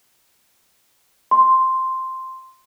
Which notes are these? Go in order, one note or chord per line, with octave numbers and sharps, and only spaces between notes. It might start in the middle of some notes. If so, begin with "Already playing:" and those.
C6